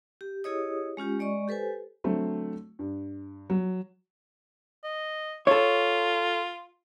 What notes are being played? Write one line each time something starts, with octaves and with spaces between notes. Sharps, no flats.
G4
E4 G4 G#4 C#5 D#5 D#6
G#3 C#4 F4 G4
G#3 D5 D#5 C#6
G4 A4 B4 C5 G#5
D3 F#3 A3 C4
G2
F#3
D#5
F4 A4 C#5